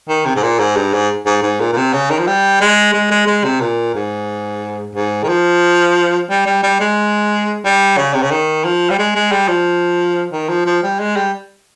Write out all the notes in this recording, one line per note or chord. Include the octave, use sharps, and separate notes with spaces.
D#3
C3
G#2
A#2
G#2
G2
G#2
G#2
G#2
A#2
A#2
C3
C#3
D#3
F3
G3
G#3
G#3
G#3
G#3
C3
A#2
G#2
G#2
D#3
F3
G3
G3
G3
G#3
G3
C#3
C3
C#3
D#3
F3
G3
G#3
G#3
G3
F3
D#3
F3
F3
G3
G#3
G3